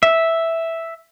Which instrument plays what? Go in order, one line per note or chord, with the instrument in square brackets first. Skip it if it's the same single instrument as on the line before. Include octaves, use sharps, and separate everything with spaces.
[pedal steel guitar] E5